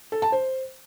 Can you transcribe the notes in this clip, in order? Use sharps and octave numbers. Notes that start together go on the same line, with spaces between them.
A4
A5
C5